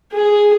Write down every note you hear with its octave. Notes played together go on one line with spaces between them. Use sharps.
G#4